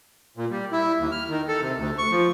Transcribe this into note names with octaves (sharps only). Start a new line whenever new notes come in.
A#2
G3
E4
D#2
F6
D#3
A4
C3
D2
C#6
F3